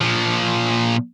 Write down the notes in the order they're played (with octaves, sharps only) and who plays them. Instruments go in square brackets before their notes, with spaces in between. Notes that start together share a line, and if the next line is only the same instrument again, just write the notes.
[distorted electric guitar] A#2 F3